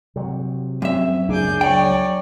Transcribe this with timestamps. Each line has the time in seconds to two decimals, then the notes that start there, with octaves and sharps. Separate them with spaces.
0.16 C3 F#3
0.82 F#2 C4 E5
1.29 C#2 A#3 D4 G#4 D6 G6
1.61 F#3 C#5 D5 G5